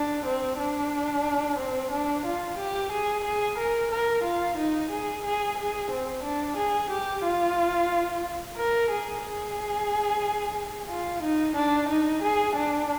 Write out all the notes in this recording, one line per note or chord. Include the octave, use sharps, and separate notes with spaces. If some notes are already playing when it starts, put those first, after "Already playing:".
Already playing: D4
C4
D4
C4
D4
F4
G4
G#4
G#4
A#4
A#4
F4
D#4
G#4
G#4
G#4
C4
D4
G#4
G4
F4
A#4
G#4
G#4
F4
D#4
D4
D#4
G#4
D4